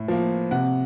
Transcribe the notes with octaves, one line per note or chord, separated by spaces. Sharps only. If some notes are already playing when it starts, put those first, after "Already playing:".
Already playing: A2
F3 A#3
C3 F#5